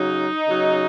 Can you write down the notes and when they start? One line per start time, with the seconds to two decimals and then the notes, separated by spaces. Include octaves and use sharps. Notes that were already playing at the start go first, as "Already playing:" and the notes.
Already playing: C#3 F#3 D#4
0.48 C#3 F#3